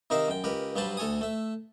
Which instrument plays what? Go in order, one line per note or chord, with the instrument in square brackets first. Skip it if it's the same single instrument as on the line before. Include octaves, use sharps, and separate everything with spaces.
[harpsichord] C3 D#3 D#4 A#4 E5 F5
F#2 G5
C#2 G4 A#4 B4
G2 F#3 G3 B4 C5 A5
D2 A4 C#5 G#5 D#6
A3 E5